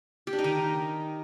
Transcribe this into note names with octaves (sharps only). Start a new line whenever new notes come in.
G4
D4
D#4
D#3